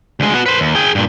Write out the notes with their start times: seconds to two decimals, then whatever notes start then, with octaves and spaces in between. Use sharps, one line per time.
0.20 D2 G#3
0.34 B3 F#4
0.46 B4 C5
0.60 D#2
0.75 G#4 G5
0.95 G2 A#2